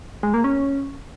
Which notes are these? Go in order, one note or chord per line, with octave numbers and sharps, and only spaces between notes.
G#3
A#3
C#4